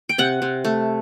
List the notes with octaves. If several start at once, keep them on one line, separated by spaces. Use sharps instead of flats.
G5
C3 F#5
C3
A3